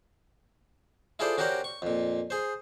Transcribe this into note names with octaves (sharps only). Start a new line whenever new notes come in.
E4 F4 G#4 A4 C5 D5
C#4 F#4 G4 A#4 C5 D5
C#6
F2 A#2
G#4 C5